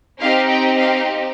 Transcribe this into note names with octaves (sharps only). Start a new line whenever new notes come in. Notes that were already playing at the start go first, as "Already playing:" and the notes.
C4 D#4 G4 F5
G5
F5